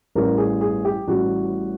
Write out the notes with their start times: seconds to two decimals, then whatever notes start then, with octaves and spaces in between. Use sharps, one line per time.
0.15 A1 A2 E3 G3 A#4
0.38 G#4
0.61 G#4
0.85 G4
1.08 A1 A2 E3 G3 F#4